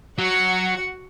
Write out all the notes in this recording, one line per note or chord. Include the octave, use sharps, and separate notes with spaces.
F#3 F#4 F#5